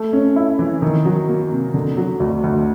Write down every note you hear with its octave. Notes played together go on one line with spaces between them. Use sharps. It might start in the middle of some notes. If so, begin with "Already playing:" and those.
Already playing: A3
C#4
E4
E3
D#3
F#3
A#3
C3
D3
F#3
D2
D2